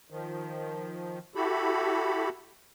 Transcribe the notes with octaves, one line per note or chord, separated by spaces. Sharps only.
D#3 F3
E4 F#4 G4 A4 B5